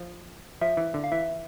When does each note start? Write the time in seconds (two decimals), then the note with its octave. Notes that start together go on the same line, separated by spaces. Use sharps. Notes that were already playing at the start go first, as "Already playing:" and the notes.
Already playing: F3
0.61 F3 E5
0.77 E3
0.94 D3
1.04 F5
1.12 E3 E5